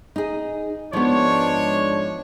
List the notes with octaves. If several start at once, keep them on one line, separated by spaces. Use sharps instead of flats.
D#4 G#4
G#2 F3 B3 D4 C#5